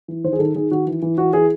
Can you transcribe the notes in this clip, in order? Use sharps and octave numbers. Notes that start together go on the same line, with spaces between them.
E3
D#3 C5
G#4
D#3 A4
D#3 G#4
D#3 F#4
E3
E3
E3 F#4
E3 G#4